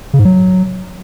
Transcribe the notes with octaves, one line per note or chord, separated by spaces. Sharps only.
C#3
G#2
F#3